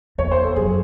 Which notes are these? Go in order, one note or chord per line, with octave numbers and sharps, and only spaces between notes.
E2 C#5
C5
A4
F#2 G#4